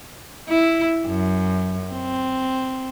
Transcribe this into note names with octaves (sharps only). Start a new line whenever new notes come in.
E4
F#2
C4